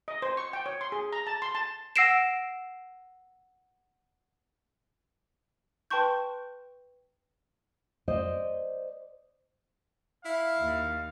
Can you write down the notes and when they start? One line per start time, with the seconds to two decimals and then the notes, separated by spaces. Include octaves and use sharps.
0.08 D#5
0.22 C5
0.37 C#6
0.53 G5
0.66 C#5
0.81 C6
0.92 G#4
1.13 A#5
1.27 A5
1.42 C6
1.55 A5
1.96 F#5 E6 A#6 C7 D7 E7
5.90 B4 G5 A5 C6 C#6 G6
8.08 C5 D5 D#5
10.25 E4 F5
10.57 D#2